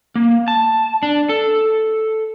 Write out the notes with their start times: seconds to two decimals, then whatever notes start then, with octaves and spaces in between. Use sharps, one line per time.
0.15 A#3
0.48 A5
1.03 D4
1.29 A4